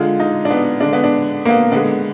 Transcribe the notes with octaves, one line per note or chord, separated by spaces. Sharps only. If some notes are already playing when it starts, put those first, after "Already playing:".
Already playing: D3 G#3 F4
D#4
D4
B3
D3 G#3 D4
B3
D4
A#3
B3
D3 G#3 B3